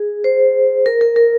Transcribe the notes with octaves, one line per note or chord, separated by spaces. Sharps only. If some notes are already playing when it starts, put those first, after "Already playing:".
Already playing: G#4
C5
A#4
A#4
A#4